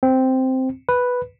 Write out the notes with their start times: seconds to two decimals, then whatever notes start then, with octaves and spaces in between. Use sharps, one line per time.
0.03 C4
0.89 B4